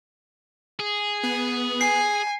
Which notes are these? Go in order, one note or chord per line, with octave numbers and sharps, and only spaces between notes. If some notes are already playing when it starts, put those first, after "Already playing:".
G#4
B3
G#5 C7